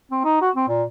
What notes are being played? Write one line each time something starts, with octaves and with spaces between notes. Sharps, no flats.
C4
D#4
F#4
C4
A#2